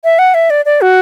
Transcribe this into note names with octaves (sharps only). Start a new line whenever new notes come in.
E5
F#5
E5
D5
D5
F#4